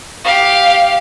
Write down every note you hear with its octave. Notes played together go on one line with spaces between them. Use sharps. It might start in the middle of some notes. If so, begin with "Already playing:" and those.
G4 F5